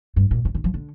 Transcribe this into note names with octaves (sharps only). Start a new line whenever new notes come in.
G2
A#2
C3
D3
F3
D3